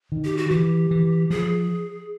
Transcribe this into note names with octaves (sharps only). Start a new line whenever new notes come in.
D#3
G4
F#4
E3 G4
E3
F3 G#4